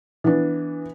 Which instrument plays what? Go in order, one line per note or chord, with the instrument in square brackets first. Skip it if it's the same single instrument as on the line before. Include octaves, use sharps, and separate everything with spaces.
[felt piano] E3 B3 D4